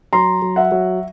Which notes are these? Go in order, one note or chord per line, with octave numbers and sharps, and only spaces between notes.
F#3 A#5 C6
F#3
E5 F#5
F#3